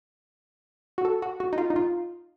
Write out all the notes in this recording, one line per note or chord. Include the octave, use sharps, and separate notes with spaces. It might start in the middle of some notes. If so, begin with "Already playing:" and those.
F#4
A4
F#4
F#4
D#4
F4
D#4
F4